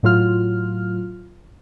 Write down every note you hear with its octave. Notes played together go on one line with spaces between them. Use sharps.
A2 F#3 F4 F6